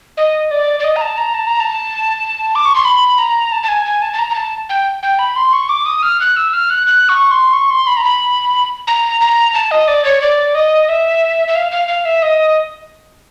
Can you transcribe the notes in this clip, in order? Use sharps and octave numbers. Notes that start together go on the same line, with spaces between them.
D#5
D5
D5
D#5
A#5
A5
A#5
A5
A#5
A5
D6
C#6
C6
B5
A#5
A5
A5
G#5
G#5
A5
A5
A#5
A#5
A5
G5
G5
B5
C6
C#6
D6
D#6
F6
F#6
E6
F6
F#6
F#6
C#6
C6
C#6
C6
B5
A#5
B5
A#5
A#5
A5
D#5
D5
C#5
D5
D#5
E5
E5
F5
F5
F5
E5
D#5